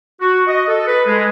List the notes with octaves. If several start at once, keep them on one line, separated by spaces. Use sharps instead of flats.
F#4
D#5
A4
B4
G#3